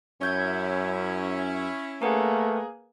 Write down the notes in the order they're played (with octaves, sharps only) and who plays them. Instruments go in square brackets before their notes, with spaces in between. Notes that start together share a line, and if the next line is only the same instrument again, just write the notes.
[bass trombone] F#2 [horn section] C#4 E4 [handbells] C#5 G6 G#6
[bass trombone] A3 [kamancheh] A#3 G#4 [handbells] A#4 B4 F#5